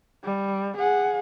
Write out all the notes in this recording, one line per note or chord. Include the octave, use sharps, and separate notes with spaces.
G3
G#4 F#5